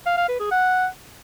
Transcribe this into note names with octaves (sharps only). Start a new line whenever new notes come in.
F5
F5
B4
G#4
F#5